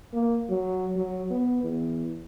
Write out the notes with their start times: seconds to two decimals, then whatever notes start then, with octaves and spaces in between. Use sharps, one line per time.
0.13 A#3
0.50 F#3
0.96 F#3
1.30 B3
1.63 E2